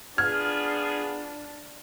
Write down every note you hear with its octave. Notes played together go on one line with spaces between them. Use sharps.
B3 D4 F4 G#4 F6 G#6